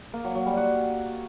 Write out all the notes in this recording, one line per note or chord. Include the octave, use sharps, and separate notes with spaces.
A#3
F#3
F#3
G3
F#4